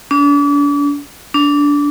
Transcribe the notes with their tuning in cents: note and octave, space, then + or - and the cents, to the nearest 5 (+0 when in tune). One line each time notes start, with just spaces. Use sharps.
D4 -40
D4 -20